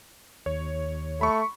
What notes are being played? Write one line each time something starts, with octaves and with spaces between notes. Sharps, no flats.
D#2 C#5
A3 B5 C#6